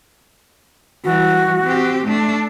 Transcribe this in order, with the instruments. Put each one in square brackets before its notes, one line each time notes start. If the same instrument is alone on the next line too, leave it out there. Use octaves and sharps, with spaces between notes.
[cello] E3 G3 [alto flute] F#4
[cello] C4 G4
A3 D4